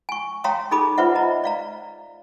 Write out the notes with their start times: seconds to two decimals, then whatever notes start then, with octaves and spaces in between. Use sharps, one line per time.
0.09 G#5 C#6
0.44 C#5 F5 G5 A#5 C6 D#6
0.71 D#4 G#4 A4 B5 D6 D#6
0.98 F4 B4 C5 D5 E5 F#5
1.15 D#5 A#5
1.44 D5 F5 A#5